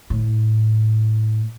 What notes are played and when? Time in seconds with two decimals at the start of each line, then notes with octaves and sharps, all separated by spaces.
0.10 A2